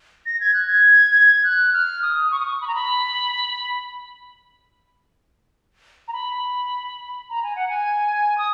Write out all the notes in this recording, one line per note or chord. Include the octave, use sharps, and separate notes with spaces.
A#6
G#6
F#6
G#6
F#6
F6
D#6
C#6
D#6
C#6
B5
A#5
B5
A#5
B5
A#5
G#5
F#5
G#5
D#6